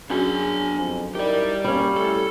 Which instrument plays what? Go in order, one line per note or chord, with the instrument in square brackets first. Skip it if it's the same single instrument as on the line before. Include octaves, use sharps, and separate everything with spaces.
[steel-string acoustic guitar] F#2 [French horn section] C#4 G#4 [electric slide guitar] D4 G#5
[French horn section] F2
[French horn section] D#4 E4 A#4 [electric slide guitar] G4 D5
[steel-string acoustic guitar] G3 C#4 [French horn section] A#3
[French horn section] A3 E4 [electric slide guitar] A4